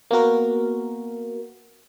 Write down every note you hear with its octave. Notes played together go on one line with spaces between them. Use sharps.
A#3 B3 F#4 A#4